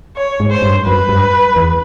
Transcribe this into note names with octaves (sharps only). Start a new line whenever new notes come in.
C#5
G#2
C5
G2
F#2 B4
G2
E2